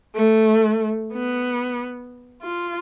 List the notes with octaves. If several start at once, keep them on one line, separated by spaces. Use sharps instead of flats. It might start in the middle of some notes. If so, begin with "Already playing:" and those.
A3
B3
F4